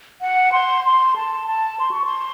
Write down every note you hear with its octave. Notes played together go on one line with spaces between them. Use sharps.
F#5
C6
C6
A5
A5
C6
C#6
C6